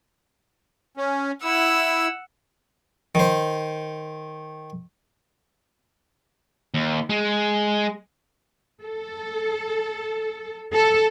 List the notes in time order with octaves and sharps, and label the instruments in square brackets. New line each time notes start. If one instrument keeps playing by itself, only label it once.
[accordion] C#4
[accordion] E4 [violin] F#5 E6
[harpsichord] D#3 C5
[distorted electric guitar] D#2
G#3
[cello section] A4
A4